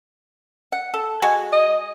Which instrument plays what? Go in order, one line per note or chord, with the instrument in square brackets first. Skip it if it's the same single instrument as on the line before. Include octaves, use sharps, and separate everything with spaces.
[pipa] F#5
A4
G#3 F#4 G#5
[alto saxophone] D#5